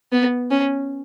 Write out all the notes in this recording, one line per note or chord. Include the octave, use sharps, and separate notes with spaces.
B3
C#4